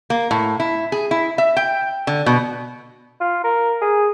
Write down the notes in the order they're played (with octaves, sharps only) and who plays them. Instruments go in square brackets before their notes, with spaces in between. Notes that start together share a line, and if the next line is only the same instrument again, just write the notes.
[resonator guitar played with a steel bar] A#3
A2
E4
G#4
E4
E5
G5
D3
B2
[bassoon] F4
A#4
G#4